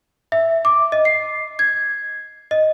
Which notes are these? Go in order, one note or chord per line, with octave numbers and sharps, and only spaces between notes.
E5
D6
D#5
C7
G#6
D#5